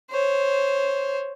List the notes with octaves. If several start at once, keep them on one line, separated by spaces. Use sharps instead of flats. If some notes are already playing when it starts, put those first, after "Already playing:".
C5 C#5